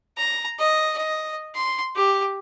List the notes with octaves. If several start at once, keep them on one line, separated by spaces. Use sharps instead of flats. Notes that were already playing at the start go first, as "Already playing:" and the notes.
A#5
D#5
D#5
C6
G4